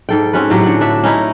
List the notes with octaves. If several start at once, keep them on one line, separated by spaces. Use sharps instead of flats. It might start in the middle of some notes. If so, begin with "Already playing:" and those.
G#2 A4 G5
C4 C#4 F#4 B4
A2 F#3 G4
D3 F#5
D4 E5
C#4 D#4 E4